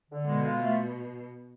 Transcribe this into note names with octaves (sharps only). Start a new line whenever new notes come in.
D3
B2 G#3
F4
A3